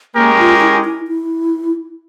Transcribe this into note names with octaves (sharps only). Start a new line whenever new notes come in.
G#3 A#3 C#4 G4 A#4
F4
E4
E4
E4